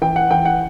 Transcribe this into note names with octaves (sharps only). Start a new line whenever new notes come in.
E3 G5
F#5
E3 G5
F#5